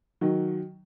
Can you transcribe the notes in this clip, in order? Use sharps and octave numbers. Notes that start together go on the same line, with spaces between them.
D#3 F#3